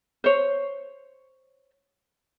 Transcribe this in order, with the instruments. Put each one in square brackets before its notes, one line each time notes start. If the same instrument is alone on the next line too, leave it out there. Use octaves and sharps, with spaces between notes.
[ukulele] C5 C#5